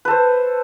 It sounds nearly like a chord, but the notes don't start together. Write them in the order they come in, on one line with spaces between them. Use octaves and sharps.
B4 A4 C5